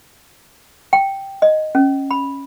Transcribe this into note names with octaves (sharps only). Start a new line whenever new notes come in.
G5
D#5
C#4
B5